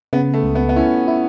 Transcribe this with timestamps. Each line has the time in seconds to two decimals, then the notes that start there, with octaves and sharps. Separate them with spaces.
0.13 C#3 B3
0.34 A3
0.44 C#2
0.55 B3
0.69 B3
0.76 C#4 E4
1.08 E4